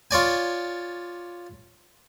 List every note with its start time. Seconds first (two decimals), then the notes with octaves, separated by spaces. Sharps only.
0.11 F4 C#5 D5 G#5